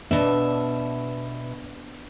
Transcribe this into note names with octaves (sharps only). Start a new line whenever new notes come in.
B2 B3 D4 E5